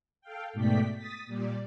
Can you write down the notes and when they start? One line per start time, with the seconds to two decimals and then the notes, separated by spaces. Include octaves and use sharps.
0.21 A4 F5 G5
0.53 G#2 B2 A3 D5 G5 B6
0.96 D#6 A6 B6
1.26 A#2 G3 D5